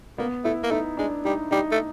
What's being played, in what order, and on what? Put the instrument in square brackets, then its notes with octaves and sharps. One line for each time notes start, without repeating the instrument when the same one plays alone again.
[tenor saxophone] A#3 [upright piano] B3
[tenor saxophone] A3 [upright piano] E4
[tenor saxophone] A#3
[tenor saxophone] A3 [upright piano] D#4
[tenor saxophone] G#3 [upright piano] D4
[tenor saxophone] G3 [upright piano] D#4
[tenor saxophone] G3 [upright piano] D#4
[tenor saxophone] A3